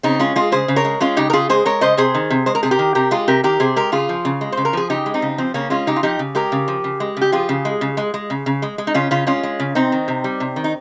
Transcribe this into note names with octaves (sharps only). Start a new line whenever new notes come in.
C#3 C4 D#4
G#3 C#4 F4
G#3 F4 G#4
C#3 G#4 C5
C#3
A#4 C#5
G#3
G#3 C#4 F4
C#3 D#4 G4
A#4
C#3 F4 G#4
G#3 G#4 C5
G#3 A#4 C#5
C#3 C5 D#5
C3 G#4 C5
D#3
C3
G#3 C5
A#4
C3 G#4
G4 A#4
D#3
C3 G4 A#4
G#3 F4 G#4
C3 G4 A#4
D#3 G4 A#4
C3 G#4 C5
G#3 G4 A#4
C#3 F4 G#4
F3
C#3
G#3
C5
C#3
A#4
F3 G#4
C#3 D#4 G4
G#3
C4 D#4
C#3
F3 C4
C#3 A#3 C#4
G#3 C#4 F4
C#3 D#4 G4
F4
F3 D#4 G4
C#3
G#3 G4 A#4
C#3
F3
C#3
G#3
C#3 G4
F3 F4 G#4
C#3
G#3
C#3
G#3
G#3
C#3
C#3
G#3
G#3
D#4
C#3 C#4 F4
C#3 C#4 F4
G#3 C#4 F4
G#3
C#3
C3 C4 D#4
D#3
C3
G3
C3
D#3
D#4